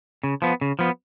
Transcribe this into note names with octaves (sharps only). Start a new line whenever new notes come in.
C#3
F3 B3
C#3
F3 B3